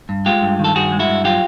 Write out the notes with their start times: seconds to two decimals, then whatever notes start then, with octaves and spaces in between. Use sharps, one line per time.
0.09 G2
0.26 G#3 F4 G4
0.42 G2
0.59 D#3
0.64 A4
0.75 G2 F#4 G#4
0.92 G#3
0.99 E4 F#4
1.08 G2
1.24 F#3 F4 G4